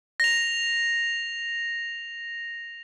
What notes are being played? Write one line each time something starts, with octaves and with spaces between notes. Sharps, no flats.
A#6 F7